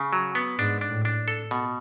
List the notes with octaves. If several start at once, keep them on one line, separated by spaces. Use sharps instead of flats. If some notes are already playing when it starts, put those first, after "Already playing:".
Already playing: C#3
F#3
B3
G#2 D4
D4
A2
D4
A4
B2